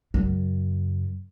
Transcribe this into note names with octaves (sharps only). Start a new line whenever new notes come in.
F#2 C#3